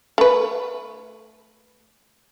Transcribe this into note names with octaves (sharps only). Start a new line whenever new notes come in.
A3 B4